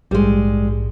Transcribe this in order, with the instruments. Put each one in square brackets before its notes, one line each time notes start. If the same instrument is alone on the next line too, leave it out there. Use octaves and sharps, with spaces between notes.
[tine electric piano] A#1 G#2 [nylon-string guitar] G3 G#3